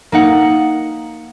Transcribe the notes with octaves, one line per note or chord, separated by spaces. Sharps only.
A#3 D#4 F#5